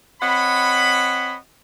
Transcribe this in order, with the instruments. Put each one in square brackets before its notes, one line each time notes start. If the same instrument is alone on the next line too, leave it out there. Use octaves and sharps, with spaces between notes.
[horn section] C4 C#5 D#5 F#5 B5